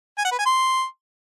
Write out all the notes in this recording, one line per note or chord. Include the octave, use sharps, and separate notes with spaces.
G#5
F#5
B4
G#5
C6